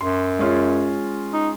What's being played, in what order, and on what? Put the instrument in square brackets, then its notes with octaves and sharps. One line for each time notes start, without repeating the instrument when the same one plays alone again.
[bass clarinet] F#2 [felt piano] C6
[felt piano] G#3 C#4 F4
[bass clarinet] D#4